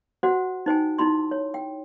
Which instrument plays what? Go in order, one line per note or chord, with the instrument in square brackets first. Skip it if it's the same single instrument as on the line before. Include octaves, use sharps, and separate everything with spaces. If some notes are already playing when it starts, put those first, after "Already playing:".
[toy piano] F#4 C5 F#5
D#4 C5 G5 G#5
D#4 E4 B5 C6
C#5
G5